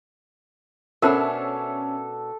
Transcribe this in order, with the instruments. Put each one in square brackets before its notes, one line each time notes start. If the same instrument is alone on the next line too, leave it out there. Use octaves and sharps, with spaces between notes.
[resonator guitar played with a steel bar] B2 D4 [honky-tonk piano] C#4 E5 [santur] A4 [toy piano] A#4 C5